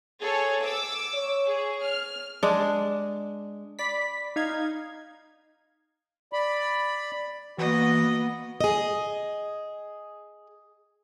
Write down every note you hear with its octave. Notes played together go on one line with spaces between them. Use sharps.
G#4 A4 C#5
D6 E6
C#5
G#4
F6
G#3 D4
D5 B5 B6
D#4 F5 G#6
D5 B5
E3 A#3 B3 F#4 D#5
G#4 D#5